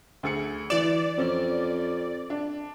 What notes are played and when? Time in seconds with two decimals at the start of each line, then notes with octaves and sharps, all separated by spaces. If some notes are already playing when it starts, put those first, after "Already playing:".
0.23 D2 G#4 C#7
0.70 E3 D5 E7
1.18 F2 C4 C#4
2.30 D4